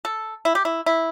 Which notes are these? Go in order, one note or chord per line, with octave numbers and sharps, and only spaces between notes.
A4
E4
G4
E4
E4